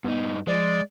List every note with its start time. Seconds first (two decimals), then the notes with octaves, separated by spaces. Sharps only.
0.04 G2 B3 D#4
0.47 F3 G#3 D5